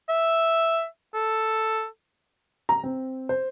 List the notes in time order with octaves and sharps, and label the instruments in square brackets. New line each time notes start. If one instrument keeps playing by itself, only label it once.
[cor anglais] E5
A4
[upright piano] A#5
C4
C5